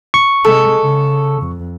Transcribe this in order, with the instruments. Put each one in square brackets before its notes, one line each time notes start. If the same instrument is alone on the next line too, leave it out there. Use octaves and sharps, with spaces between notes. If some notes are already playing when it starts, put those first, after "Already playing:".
[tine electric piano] C#6
[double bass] C3 G#3 [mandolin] A4
[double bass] C#3
F2